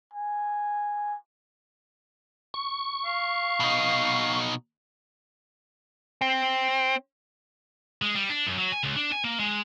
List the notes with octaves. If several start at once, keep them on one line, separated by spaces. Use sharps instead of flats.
G#5
C#6
F5
B2 D#4
C4
G#3
G3
D4
F#2
F#3
G#5
C#2
D4
G#5
A#3
G#3